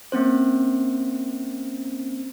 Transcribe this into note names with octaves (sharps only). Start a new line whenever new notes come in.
A#3 C4 C#4 C5